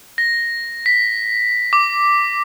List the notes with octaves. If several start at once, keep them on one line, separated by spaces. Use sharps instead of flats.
A#6
B6
D6